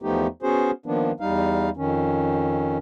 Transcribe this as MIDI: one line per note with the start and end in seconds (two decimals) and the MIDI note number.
0.02 0.27 40
0.02 0.27 53
0.02 0.27 57
0.02 0.27 59
0.02 0.27 63
0.02 0.27 67
0.43 0.71 59
0.43 0.71 61
0.43 0.71 66
0.43 0.71 68
0.43 0.71 72
0.86 1.12 51
0.86 1.12 53
0.86 1.12 58
0.86 1.12 59
0.86 1.12 62
1.20 1.70 40
1.20 1.70 55
1.20 1.70 63
1.20 1.70 77
1.77 2.78 41
1.77 2.78 51
1.77 2.78 61